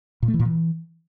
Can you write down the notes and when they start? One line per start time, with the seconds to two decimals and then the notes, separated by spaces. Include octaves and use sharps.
0.22 A#2
0.28 A3
0.34 E3
0.40 A#2
0.45 E3